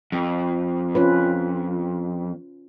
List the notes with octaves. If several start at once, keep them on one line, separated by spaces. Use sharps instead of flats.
F2
C#4 F4 B4